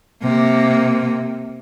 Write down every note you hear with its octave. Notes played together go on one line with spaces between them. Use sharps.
C3 A#3